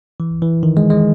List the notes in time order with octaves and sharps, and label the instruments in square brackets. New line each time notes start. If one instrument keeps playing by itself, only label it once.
[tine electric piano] E3
E3
D#3
G#3
G#3